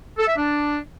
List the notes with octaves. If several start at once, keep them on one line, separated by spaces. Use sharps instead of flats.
A4
E5
D4